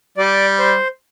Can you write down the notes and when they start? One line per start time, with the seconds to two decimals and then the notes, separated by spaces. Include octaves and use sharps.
0.17 G3 D5
0.59 C5